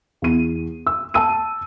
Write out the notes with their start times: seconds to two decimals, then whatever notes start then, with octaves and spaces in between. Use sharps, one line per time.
0.22 E2 D#7
0.87 E6
1.14 A5 E6 D#7